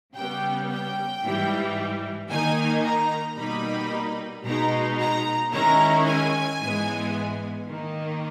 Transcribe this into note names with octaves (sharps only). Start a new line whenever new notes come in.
C#3 G3 B3 G5
G5
G#2 E3 G3
D#3 A#3 D#4 G#5
A#5
B2 G3 A#3 D#4 B5
B2 G#3 D#4 A#5
A#5
D#3 G#3 C#4 E4 A#5
G#5
G#2 E3 G#3 B3
D#3 A#3 D#4